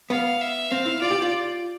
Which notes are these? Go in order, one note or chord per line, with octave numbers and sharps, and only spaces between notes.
B3 F5
E5
C4 F5
E4
F4 D5
G4
F4